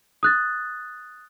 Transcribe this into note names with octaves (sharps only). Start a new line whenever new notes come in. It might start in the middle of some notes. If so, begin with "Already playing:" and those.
D#6 F#6 A6